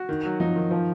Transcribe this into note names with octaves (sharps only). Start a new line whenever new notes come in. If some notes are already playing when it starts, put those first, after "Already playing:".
Already playing: F#4
D#3
F#3
F3 D#4
D#3
F3